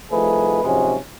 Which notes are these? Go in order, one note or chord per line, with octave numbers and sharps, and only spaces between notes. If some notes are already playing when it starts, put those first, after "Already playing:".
C2 F3 A3 D#4 G#4 B4
G#2 C3 F3 F#3 G#3 C#4